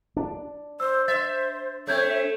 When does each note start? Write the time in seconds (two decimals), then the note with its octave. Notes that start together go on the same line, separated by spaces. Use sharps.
0.17 D4
0.80 C5 E6
1.08 C5 E5 A6
1.87 A3 C4 C#5 E5 G6 G#6